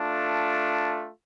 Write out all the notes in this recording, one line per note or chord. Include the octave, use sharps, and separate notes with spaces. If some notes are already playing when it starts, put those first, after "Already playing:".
Already playing: A3 D4 F4